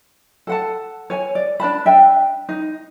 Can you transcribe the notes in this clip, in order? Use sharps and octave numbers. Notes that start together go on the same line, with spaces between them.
A4 F#5 A5
C#5 G#5
D5
D4 B4 A5 B5
D4 E5 G5
D#4